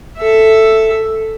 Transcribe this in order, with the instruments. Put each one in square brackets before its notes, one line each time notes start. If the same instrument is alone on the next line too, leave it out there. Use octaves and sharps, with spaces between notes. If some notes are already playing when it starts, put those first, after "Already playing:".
[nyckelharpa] A4 E5